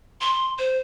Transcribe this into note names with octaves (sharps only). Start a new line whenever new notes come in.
C6
C5